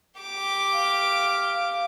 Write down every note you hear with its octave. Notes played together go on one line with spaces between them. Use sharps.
G4 D6
F5